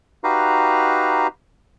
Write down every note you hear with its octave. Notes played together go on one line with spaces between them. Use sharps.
D#4 F#4 G4 B4 F5 A#5